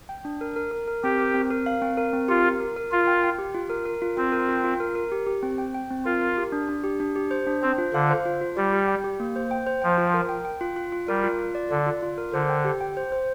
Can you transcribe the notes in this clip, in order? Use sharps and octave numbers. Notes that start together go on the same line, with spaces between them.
G5
D4
A#4
A#4
A#4
A#4
C4 G4
A#4
C4
A#4
F5
C4
A#4
C4
F4 G4
A#4
A#4
A#4
F4 A#4
G5
G5
G4
F4
A#4
A#4
F4
C4 F4
A#4
F4
F4
A#4
A#4
G4
G4
C4
G5
G5
C4
F4 A#4
A#4
G4
D4
D4
G4
D4
G4
C5
D4
C4 C5
F4
D3 F5
C5
F4
F4
G3 G4
G4
G5
G4
A#3
C5
G5
C5
F3 G5
F4
A#4
G5
G5
F4
F4
F4
G3 A#4
F4
F4
D5
D3 D5
F4
F4
A#4
D3 C5
G5
G4
G5
C5
C5